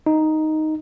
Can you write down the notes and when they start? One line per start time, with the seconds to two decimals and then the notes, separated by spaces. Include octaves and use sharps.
0.06 D#4